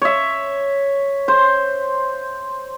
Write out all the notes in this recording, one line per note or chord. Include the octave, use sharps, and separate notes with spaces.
C#5 E5
C5